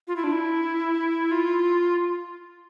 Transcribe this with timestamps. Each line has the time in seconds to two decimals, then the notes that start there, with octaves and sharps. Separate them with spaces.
0.08 F4
0.16 E4
0.24 D4
0.32 E4
1.31 F4